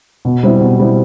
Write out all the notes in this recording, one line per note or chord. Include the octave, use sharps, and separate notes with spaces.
B2
G3 C4 E4
B2
G3 C4 E4